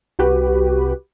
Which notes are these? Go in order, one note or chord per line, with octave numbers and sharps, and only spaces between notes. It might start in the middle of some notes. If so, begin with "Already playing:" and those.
C2 F#4 G4 B4